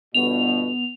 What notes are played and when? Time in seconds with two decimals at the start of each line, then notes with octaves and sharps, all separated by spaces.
0.14 G1 B2 B3 F7